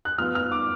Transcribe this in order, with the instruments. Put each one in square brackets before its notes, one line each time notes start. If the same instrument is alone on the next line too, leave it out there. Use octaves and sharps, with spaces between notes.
[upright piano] F#6
F3 B3 F4 F6
F6
D6